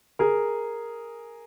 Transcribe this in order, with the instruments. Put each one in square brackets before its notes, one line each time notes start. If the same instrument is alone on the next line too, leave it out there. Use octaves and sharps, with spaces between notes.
[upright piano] G#4 A#4